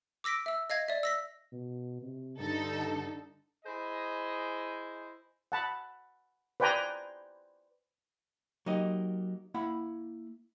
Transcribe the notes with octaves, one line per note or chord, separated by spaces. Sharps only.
D6 E6 A#6 B6 D7
E5 E6
D#5 F5 G#6 A#6
D5 E5
E6 A#6 B6
B2
C3
G2 D3 D#4 A4
E4 G#4 C5 D#5
F#5 A5 B5
B4 C5 D5 G5 G#5 A#5
F#3 A#3 D#4 G4 D#5
A#3 E4 F#5 B5